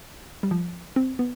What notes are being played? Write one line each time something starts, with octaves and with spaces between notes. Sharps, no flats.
G3
F3
C4
B3